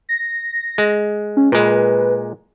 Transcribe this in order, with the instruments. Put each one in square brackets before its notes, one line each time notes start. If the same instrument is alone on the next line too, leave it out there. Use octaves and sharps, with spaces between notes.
[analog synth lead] A#6
[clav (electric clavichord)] G#3
[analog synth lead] C#4
[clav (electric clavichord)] A#2 G#3 [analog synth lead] B4